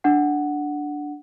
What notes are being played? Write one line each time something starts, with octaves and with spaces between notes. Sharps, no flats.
D4 F#5